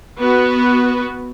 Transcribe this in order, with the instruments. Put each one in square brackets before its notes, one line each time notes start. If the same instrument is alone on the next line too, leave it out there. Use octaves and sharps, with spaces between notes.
[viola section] B3 F#4 B4